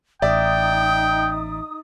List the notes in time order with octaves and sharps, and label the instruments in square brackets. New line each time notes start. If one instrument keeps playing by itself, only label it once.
[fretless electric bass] A1 [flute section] D#4 D#6 [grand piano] D5 E5 [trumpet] G5